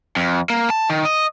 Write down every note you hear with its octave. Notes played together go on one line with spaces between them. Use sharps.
F2
A#3
A5
D#3
D#5